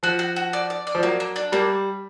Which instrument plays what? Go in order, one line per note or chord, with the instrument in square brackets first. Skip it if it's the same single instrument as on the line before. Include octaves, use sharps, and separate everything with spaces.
[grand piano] F3 [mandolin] F#4
[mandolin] F#4
F#4
D5
D5
D5
[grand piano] F3
[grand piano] F#3 [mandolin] A#3
[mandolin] A#3
D4
[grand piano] G3 [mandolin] A#3